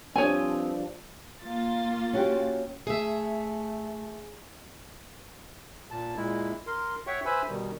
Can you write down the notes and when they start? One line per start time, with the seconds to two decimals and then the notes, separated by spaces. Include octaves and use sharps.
0.16 G2 F3 C4 D4 G4 C#5 G#5 D#6
1.43 A#3 F4 A6
2.13 C#4 F#4 G4
2.87 A3 G#4 E5
5.91 A#2 A5
6.16 A#2 G#3 E4
6.67 A#4 C6
7.07 C#5 E5 F#5 G5 C#6
7.25 B4 C5 E5 G#5 B5 E6
7.49 B2 D#3 G3